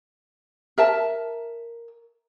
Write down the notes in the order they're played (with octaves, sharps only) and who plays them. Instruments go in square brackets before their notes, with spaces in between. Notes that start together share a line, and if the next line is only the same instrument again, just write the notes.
[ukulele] A#4 E5 A5